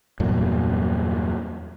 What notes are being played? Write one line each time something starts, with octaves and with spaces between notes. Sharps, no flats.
E2 G2 A#2 F#3